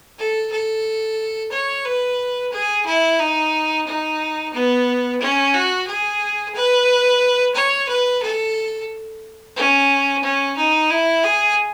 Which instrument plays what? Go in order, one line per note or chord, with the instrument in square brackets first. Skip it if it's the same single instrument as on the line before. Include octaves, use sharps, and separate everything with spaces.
[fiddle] A4
A4
C#5
B4
G#4
E4
D#4
D#4
B3
C#4
F#4
G#4
B4
C#5
B4
A4
C#4
C#4
D#4
E4
G#4